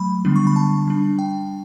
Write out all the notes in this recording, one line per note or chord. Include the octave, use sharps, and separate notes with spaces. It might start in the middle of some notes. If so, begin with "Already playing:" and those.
Already playing: F#3 A3 B5
D3 G3 B3 D4
C#6
B5
A5
G3 D4
G5